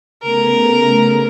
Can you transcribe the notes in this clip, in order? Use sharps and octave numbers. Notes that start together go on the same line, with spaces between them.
C#3 A3 B3 A#4